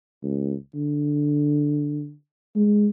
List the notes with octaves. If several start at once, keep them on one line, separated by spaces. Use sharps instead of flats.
C#2
D3
G#3